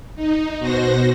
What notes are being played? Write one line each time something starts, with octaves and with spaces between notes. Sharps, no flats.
D#4
B2 F#4 C5 A#6